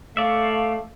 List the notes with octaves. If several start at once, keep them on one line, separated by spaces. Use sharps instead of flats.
A3 C#5 D5 E5 F5